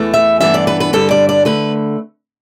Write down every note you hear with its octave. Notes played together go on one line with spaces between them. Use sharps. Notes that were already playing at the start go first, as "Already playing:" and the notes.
Already playing: E2 E3 A3
E5
G2 E3 B3 D4 E5
D5
B4
B4
G2 D3 G3 D4 A4
D5
D5
D3 A3 B4